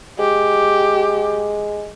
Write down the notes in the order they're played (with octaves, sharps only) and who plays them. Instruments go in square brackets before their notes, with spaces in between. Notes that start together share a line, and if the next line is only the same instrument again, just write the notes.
[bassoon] G#3 [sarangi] G4